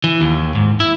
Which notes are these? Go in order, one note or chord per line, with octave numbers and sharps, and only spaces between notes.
E3
D#2
G#2
E4